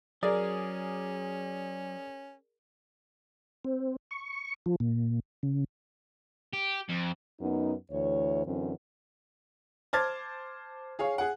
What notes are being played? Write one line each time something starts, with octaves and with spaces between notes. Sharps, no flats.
F#3 C#4 G#4 A#4 D5
C4
C#6
F3
A#2
C#3
G4
F2
F#2 B3 D#4
D2 E3 C#5
F#2 D3 E3 C4
C5 A5 D6 F6 G#6 A6
G#4 C#5 F5
G#4 F#5